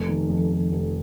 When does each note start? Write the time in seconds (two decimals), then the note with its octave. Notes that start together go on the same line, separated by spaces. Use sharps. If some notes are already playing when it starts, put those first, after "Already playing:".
Already playing: F1
0.09 D#3
0.30 F2
0.51 F1
0.72 F1